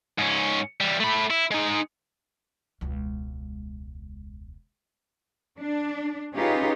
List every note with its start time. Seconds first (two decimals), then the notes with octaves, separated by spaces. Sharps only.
0.18 G#2 C#4
0.81 E3 G3
1.00 A3 B5
1.30 E4
1.51 G#3 D#4
2.81 E1 C#2
5.59 D4
6.36 C#4 D#4 F4 G4 G#4 B4